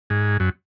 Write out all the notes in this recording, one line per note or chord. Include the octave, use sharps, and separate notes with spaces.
G#2
F#2